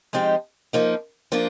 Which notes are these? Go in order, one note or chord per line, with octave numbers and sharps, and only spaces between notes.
F3 G#3 C4 D#4 G4
F3 A#3 D#4
F3 A#3 D4 F4